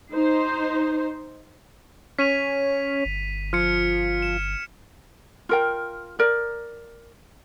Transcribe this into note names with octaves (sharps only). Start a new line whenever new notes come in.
D#4 C5
C#4 B6 D#7 F7
G1
F3 F6 G#6 C#7
E7
F4 A#4 G5
A#4 D5